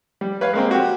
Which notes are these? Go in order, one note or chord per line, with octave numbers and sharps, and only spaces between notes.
G3
B4 C#5 F5
G#3 A#3 C4
F#4 G4